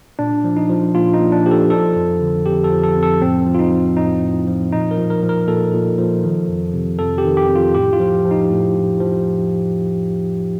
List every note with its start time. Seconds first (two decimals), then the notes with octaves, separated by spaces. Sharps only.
0.19 A#2 D4
0.44 F3
0.57 D#4
0.70 F3
0.95 A#2 F4
1.13 D#4
1.20 A#2
1.32 D4
1.45 F3 G4
1.51 A4
1.70 F3 A4
1.96 F2
2.21 D3
2.46 F2 G4
2.64 A4
2.71 F3
2.84 A4
2.97 F2
3.03 A4
3.21 A2 C4
3.46 F3
3.55 F4
3.59 D#4
3.72 F3
3.97 A2 D#4
4.22 A2
4.47 F3
4.72 A#2 D#4
4.91 A#4
4.97 F3
5.10 A#4
5.23 F3
5.29 A#4
5.48 A#2 A4
5.73 A#2
5.98 F3
6.23 D#3
6.49 F2
6.74 C3
6.99 F2 A4
7.18 G4
7.25 D#3
7.37 G4
7.49 F2
7.56 F4
7.74 A2 G4
7.93 F4
8.00 F3
8.25 F3
8.31 D#4
8.50 A2
8.75 A2
9.00 F3